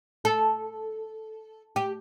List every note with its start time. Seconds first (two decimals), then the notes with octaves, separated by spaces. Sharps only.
0.25 A4
1.76 G4